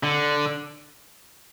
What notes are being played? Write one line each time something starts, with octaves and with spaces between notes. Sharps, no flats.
D3